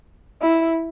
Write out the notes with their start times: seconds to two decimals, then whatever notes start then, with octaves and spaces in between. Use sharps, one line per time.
0.42 E4